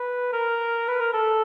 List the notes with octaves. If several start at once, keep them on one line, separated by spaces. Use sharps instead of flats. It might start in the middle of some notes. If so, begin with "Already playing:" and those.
Already playing: B4
A#4
B4
A#4
A4